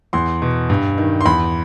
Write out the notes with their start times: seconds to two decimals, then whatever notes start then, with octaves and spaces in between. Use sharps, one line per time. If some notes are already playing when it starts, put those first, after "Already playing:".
0.13 E2 C6
0.42 B2
0.70 G2
0.98 D#3
1.21 C6
1.25 E2 B5